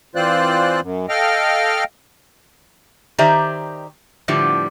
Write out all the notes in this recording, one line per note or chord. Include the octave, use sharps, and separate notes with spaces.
E3 C4 F4 C5 D5 F#6
F#2
A4 D#5 F5 G5 F6
D#3 G4 C5 D5 E5 A#5
A2 D3 F3 G3 B3